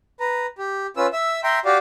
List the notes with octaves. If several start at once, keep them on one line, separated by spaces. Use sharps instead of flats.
B4 A#5
G4
C#4 F4 B4 E6
E5 E6
E5 G5 A#5 C6
F#4 G4 D5 F5